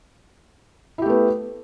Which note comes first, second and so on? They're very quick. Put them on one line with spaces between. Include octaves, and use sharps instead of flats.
E4 G4 A3 B3